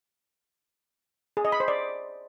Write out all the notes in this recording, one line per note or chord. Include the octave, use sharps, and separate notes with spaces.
G#4
D#5
B5
C5
D5